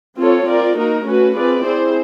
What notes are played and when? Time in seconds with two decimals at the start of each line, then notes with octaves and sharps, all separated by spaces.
0.18 C4 F4 A4 C#5
0.48 C4 F4 A#4 D5
0.77 A#3 D#4 F#4 A#4
1.06 A3 C#4 F#4 B4
1.36 C4 F4 G#4 B4 D5
1.65 C4 E4 G#4 C5